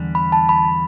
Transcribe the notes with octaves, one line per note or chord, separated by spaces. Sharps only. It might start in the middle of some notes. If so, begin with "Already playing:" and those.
Already playing: E2 D3 G3
B5
A5
B5